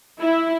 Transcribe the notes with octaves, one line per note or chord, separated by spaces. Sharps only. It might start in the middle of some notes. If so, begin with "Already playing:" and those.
E4